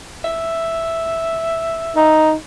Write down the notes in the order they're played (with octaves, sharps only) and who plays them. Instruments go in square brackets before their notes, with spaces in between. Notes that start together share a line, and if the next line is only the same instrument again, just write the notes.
[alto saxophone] E5
[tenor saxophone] D#4